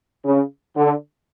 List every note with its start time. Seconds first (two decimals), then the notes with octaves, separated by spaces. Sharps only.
0.25 C#3
0.76 D3